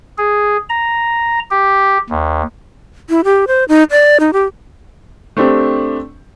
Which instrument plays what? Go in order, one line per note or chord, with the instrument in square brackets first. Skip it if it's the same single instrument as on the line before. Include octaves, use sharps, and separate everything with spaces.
[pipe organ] G#4
A#5
G4
D#2
[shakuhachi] E4
G4
C5
D#4
D5
D#4
G4
[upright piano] A3 C4 D4 G4